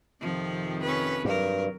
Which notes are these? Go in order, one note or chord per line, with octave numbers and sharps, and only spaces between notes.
F2 C3 D#3 F3
C#4 B4
G2 F#3 A#4